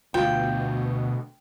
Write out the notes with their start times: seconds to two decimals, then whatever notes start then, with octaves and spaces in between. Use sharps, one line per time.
0.14 D2 B2 F4 G5